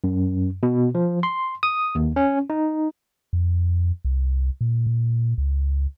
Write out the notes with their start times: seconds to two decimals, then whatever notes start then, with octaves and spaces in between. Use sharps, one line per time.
0.04 F#2
0.63 B2
0.95 F3
1.23 C6
1.63 D#6
1.95 D#2
2.16 C#4
2.50 D#4
3.33 F2
4.05 C2
4.61 A#2
4.87 A#2
5.38 C#2